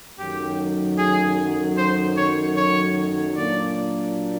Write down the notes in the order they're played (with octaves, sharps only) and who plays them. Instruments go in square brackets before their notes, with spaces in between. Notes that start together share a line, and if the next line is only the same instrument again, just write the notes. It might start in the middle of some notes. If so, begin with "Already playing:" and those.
[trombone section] F#2 D#3 F#3 A3 [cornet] G4
[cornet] G#4
C5
C#5
C#5
[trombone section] A#2 F#3 A#3 D4 [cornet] D5